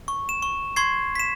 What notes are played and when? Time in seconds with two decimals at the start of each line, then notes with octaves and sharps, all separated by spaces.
0.08 C#6
0.29 E7
0.42 C#6
0.76 C6 C#6 G#6 C7
1.15 B6 E7